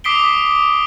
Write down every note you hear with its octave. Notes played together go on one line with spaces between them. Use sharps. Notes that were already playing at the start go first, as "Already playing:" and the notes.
D6 D#6 B6 C7 D7 G7